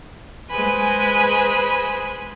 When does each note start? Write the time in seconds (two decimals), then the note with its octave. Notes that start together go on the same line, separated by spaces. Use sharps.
0.50 G#3 B4 C5 G#5 B5